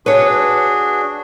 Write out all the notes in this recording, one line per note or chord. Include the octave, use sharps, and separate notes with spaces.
D4 F#4 G#4 B4 C#5